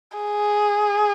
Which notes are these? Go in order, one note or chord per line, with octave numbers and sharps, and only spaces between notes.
G#4